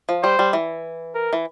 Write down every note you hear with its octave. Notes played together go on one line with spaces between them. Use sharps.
F3
G3 C5
G3
E3
A#4
E3